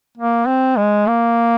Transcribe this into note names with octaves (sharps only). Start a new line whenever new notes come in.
A#3
C4
G#3
A#3